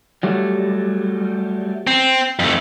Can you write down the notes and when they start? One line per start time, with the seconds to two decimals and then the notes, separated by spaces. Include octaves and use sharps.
0.23 F#3 G3 A3
1.87 C4
2.39 F2 A3